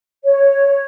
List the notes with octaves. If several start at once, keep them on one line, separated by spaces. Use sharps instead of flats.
C#5